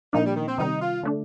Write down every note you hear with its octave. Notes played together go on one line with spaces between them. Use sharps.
A#2 F3 A#3 D4 D#4
G3
D#3
C4
C3 D#3 G3 D#4
F4
D3 A3 D4